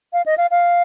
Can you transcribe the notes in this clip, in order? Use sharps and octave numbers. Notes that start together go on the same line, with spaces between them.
F5
D#5
F5
F5